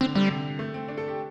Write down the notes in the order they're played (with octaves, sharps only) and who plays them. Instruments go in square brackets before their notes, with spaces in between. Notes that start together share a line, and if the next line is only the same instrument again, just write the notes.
[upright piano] D3 [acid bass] C4
[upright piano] D3 [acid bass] G3
[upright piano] C3
A3
C4
D4
A4
G4